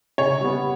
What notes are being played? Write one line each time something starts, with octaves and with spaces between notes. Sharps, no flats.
C#3 C#5
G3 B3